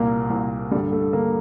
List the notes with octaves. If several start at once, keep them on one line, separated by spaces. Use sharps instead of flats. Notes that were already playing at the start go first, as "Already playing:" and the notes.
Already playing: C2 A#2 A#3
C2 A#2
G2 D3 G3
A3
D3 A#3